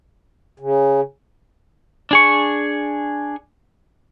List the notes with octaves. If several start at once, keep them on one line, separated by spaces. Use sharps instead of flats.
C#3
D4 G#4 C#6